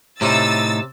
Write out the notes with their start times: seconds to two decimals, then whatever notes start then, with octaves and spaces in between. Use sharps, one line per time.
0.21 A2 C3 C#4 D#4 E4 E6 A6